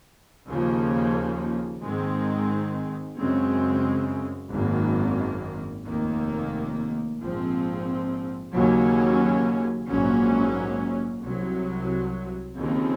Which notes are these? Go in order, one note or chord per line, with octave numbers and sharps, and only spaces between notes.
D#2 C#3 F3 A#3
G#2 D#3 G#3 C4
F#2 C#3 G#3 C4
G#1 F#2 D#3 A#3
F1 D#2 D#3 A#3
A#1 G#2 F3 C4
D#2 C#3 F#3 A#3 C#4
A#1 G#2 F#3 A#3 C#4
C2 C3 F#3
D#2 C#3 F3 C4